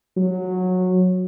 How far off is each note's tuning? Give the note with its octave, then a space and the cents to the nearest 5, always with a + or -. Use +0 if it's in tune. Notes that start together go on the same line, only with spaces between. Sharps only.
F#3 -15